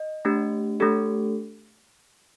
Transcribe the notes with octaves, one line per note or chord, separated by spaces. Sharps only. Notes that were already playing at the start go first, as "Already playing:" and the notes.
Already playing: D#5
A3 D4 G4
A3 D4 G4 A4